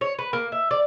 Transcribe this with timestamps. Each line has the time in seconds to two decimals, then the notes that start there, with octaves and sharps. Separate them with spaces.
0.01 C#5
0.19 B4
0.33 A#3
0.52 E5
0.71 D5